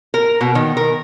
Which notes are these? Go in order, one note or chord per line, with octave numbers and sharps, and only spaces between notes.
A#4
B2
D#3
A#4